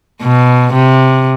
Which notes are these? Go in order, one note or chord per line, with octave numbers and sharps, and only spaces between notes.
B2
C3